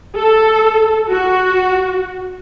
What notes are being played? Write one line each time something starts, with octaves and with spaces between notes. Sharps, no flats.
A4
F#4